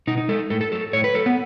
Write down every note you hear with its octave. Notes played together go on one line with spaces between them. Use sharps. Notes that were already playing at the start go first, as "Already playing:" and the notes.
B2 D#4
D#4
G#3 A4
A2 A4
A4
F#3 A4
A2 C#5
B4
F#3 A4
B3